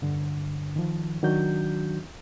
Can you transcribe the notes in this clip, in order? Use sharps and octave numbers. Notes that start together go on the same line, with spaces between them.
G2 D3
D#3 F3
D#3 F#3 D4 F#4 G6